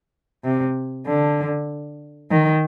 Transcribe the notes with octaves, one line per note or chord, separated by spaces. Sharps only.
C3
D3
D#3